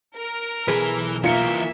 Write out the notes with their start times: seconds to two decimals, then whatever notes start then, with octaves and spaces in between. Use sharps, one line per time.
0.16 A#4
0.68 B1 E3 G#4 B4 B5
1.24 E3 A#3 F4 A#4 E5 C#7